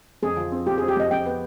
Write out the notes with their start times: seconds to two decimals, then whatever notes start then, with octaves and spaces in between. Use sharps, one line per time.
0.22 F2 G#4
0.37 F3
0.52 C4
0.67 F2 G4
0.78 G#4
0.81 C4
0.88 G4
0.96 F2 D#5
1.11 F2 G5
1.26 B3